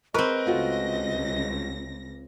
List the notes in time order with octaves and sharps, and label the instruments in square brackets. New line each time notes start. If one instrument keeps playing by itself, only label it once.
[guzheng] C4 B4 [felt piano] A#4 C#6 [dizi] D#5
[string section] C#2 A#6 [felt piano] A3 F4 F#4